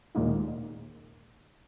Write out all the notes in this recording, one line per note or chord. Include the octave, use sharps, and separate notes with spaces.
D#2 A#2 G#3 A#3 D#4